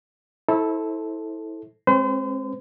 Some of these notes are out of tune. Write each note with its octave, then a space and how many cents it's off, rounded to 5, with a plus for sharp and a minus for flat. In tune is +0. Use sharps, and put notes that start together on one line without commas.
E4 -25 A4 -5 C5 +15
G#3 +15 C4 +35 C5 -40